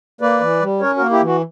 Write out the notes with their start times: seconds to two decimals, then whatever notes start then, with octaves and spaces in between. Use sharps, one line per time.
0.21 A#3 B4 D5
0.40 E3
0.61 G3
0.81 C#4 A#4 C#5
0.96 A#3 F#4 A#4
1.11 E4 G4
1.22 E3 F#4